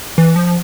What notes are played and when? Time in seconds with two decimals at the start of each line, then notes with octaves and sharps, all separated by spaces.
0.18 E3
0.36 F3